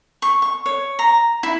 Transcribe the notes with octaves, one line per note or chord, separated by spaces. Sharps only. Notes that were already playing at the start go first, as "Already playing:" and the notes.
C#6
C#6
C#5
A#5
E4